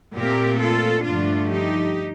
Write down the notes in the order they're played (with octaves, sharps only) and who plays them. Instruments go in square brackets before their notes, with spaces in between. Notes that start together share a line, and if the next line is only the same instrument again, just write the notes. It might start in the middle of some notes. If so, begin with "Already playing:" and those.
[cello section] A#2 A3 C4 G4 A#4
F4 A4
G2 D3 F3 A3 D4 F4
D#4 G4